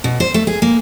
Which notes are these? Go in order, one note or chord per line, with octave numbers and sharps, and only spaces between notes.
B2
C5
A3
G#4
A#3